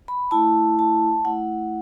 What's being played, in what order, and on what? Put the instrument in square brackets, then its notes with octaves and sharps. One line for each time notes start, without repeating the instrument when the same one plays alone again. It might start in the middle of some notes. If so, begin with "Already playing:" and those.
[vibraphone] B5
A3 E4 A5
A5
A3 E4 F#5